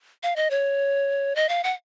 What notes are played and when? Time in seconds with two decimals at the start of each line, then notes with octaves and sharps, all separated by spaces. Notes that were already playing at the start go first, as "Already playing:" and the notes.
0.23 F5
0.36 D#5
0.50 C#5
1.36 D#5
1.49 F5
1.64 F#5